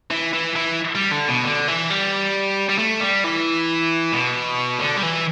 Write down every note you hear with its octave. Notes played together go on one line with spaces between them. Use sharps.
E3
E3
E3
G3
D3
B2
D3
E3
G3
G3
A3
G3
E3
B2
D3
G3
E3